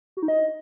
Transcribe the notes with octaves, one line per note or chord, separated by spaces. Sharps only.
F#4
D#4
D#5